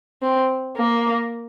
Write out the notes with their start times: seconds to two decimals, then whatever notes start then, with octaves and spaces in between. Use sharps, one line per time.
0.22 C4
0.77 A#3